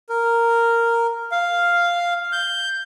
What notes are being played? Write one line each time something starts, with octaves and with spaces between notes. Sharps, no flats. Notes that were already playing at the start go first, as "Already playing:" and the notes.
A#4
F5
G6